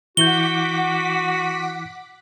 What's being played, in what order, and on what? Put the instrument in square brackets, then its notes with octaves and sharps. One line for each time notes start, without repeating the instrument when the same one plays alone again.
[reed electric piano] E3 E4 G6 [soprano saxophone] F#4 [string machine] F#5 D6 B6 [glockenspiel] G7